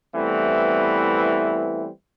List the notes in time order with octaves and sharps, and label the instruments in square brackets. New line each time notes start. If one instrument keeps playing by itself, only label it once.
[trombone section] E3 G3 A3 B3 C4 E4